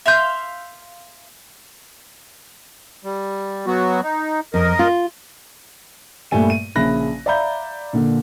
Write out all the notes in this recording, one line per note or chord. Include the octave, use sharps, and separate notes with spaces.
E5 F5 C6 G6
G3
F#3 B3 F#4
D#4
F2 A#4 D#5
F4
G2 A#2 G3 A3 G#5 D#7
D#7
A#1 C#3 E5 B5 F#6 A#6
D5 E5 F5 A#5 B5 G6
A#2 D3